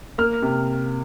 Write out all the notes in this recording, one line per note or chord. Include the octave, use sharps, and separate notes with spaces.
A#3 F6
C3